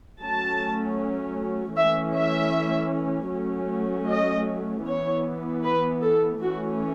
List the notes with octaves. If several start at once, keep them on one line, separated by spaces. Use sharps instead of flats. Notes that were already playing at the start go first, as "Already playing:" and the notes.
F#3 A3 C#4 A5
E3 A3 C#4 E5
E5
F#3 A3 C#4
D#5
E3 B3 C#5
B4
A4
E3 A3 C#4 F#4